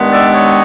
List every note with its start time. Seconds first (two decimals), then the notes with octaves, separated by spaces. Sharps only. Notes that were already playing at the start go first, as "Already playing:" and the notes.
Already playing: G2 D#3 G#3 B3
0.12 D5 E5
0.34 C#5 D#5